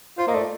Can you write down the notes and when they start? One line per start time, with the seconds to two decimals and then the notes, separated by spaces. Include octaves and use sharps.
0.18 F4 C5
0.27 A#3 D#5
0.34 A3 D5